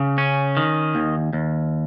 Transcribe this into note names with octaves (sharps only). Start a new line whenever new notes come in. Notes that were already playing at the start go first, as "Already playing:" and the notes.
Already playing: C#3
C#4
D#3
D#2
D#2